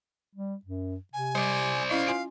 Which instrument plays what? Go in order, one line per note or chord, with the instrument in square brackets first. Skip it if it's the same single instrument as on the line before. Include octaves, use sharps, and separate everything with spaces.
[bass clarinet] G3
F#2
[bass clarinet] C3 [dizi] G#5
[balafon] G3 [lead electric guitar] C5 D5
[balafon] C#4 E4 D#5 [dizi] F5
[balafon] F4 G#5 C6